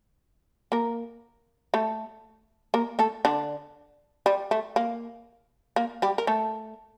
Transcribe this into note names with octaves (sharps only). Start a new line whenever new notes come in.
A#3 A#4
A3 A4
A#3 A#4
A3 A4
D3 D4
G3
A3
A#3
A#3
G3 G4
A#4
A3 A4